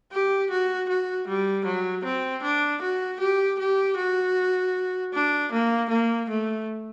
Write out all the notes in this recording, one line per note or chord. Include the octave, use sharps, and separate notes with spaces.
G4
F#4
F#4
G3
F#3
C4
D4
F#4
G4
G4
F#4
D4
A#3
A#3
A3